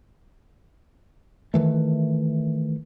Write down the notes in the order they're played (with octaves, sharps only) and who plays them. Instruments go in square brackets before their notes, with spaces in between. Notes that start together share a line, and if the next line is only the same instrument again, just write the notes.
[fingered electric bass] D#3 E3 A3